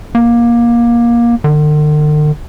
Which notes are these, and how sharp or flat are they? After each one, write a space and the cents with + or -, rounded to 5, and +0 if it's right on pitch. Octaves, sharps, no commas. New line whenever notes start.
A#3 +20
D3 +45